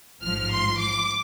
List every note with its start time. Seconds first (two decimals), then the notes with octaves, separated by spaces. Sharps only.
0.22 A1 G#2 F3 F6
0.51 C6
0.79 D6